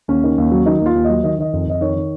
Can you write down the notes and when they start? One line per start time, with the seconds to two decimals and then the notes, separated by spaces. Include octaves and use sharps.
0.08 D#2 C#4
0.24 D#3
0.38 D#2
0.52 F#3
0.66 D#3 D#4
0.81 D#2 F4
0.95 D#2
1.05 F#3 D#5
1.24 D#3 D#5
1.39 D#3 D#5
1.53 F2
1.67 F2 D#5
1.81 D#3 C#5
1.96 D#3